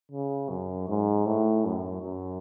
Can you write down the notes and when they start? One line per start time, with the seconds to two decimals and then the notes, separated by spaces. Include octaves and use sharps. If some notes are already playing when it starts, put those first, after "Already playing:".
0.12 C#3
0.49 F#2
0.89 G#2
1.26 A2
1.65 F#2
2.03 F#2